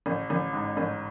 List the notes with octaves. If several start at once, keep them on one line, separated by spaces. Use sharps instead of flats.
A1
A1
G#2
A1